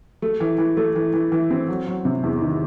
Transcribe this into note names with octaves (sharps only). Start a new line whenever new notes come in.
A3
E3
E3
A3
E3
E3
E3
C4
F#3
F#3
C3
E2
D#3